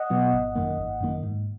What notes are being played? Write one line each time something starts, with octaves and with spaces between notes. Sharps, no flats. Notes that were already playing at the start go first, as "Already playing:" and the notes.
Already playing: D#5 F#5
B2 F#3 B3
G#1
F#2 D#3 A#3
G#1
F#2 D#3 A#3
G#2